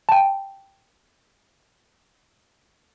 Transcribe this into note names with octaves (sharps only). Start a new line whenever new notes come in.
G5 A5